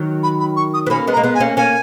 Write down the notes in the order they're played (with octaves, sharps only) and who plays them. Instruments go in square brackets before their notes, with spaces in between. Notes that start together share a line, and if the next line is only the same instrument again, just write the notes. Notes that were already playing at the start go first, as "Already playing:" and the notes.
Already playing: [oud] D#3 F#3
[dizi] B5
B5
C#6
D#6
[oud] B3
[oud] A#3 C#4 [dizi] B5
[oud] G#3 B3
[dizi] A#5
[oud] A#3
G#3 B3
[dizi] G#5
[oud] A#3 C#4
[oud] A#3 C#4 [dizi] G#5